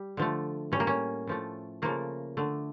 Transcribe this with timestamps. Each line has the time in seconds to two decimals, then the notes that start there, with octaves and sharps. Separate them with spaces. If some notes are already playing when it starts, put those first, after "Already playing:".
Already playing: G3
0.17 D3 F3 A3
0.72 A2 G3 C#4
0.80 A#3
0.87 C#4
1.27 A2 F3 A3
1.82 C#3 F3 A3 A#3
2.37 D3 A3